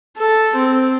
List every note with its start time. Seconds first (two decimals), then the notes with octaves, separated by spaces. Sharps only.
0.17 A4
0.56 C4